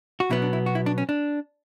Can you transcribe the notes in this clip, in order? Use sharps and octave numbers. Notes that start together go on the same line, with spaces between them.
F#4
B2 F#3 B3 E4
D4
E4
F#4
E4
D4
C#4
D4